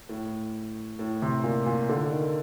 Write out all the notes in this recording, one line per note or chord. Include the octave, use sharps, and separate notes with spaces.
A2
A2
C3
A#2
A#2
D3
D#3